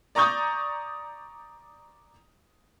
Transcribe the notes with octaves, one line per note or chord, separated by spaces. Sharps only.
D5 A#5 C#6 D#6 G6